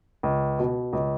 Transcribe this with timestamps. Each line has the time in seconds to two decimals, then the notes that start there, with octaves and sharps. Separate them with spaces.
0.23 C#2
0.59 B2
0.93 C#2